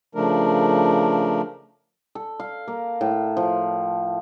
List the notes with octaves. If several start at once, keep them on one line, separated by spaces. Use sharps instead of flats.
C#3 F3 A3 D4 A#4
A4
F5
A#3
A2
F3